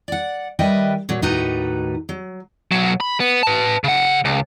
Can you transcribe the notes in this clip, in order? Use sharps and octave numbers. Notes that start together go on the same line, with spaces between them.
D5 F#5
D#3 G3 B4 D#5 E5 G5
A#2 F#3
D#2 A2 D#4 F#4 B4 A#5
F#3
B1 F#3
B5
B3
B4 A5
C#3 F#5
C#2